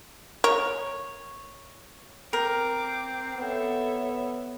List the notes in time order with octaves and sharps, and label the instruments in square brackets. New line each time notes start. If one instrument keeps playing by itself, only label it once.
[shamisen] A#4 [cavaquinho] C#5
[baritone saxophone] C4 [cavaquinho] A#4 [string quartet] D6
[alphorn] B3 [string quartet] A4 C#5 E5